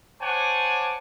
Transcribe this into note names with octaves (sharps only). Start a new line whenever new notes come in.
C5 C#5 F#5 G#5 A5 D6